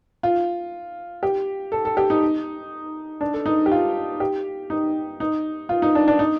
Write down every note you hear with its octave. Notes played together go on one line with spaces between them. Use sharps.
F4
G4
A4
A4
G4
D#4
D4
A4
D#4
G4
F4
G4
D#4
D#4
F4
D#4
D4
D4
D#4